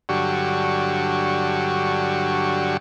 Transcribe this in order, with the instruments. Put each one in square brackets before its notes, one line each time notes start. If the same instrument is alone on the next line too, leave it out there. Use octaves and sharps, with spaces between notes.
[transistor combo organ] G2 D3 F#3 F#4 G4 C#6